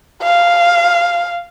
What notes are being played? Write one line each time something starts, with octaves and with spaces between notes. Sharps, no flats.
F5